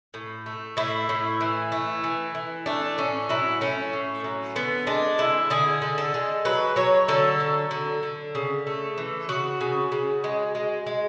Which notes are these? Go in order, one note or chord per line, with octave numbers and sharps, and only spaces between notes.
A2
A3
A2 E4
A2
E3
A3
E3
E3
A3 D4
A2 C#4
F#3 E4
A3 C#4
A2
F#3
D3 B3
G#3 D4
D3 E4
D3 G#4
D3
A4
G#3
F#3 B4
F#3 C#5
D3 A4
F#3
D3
D3
C#3
A3
E3
C#3 F#4
C#3
C#3
G#3
G#3
G#3